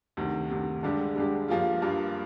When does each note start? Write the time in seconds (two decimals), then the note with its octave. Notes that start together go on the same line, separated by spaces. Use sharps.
0.17 D2 C3 D#3
0.50 D2 C3 D#3
0.83 G2 D3 G#3 D4 G4
1.16 G2 D3 G#3 D4 G4
1.48 G2 F3 A#3 F4
1.82 G2 F3 A#3 F4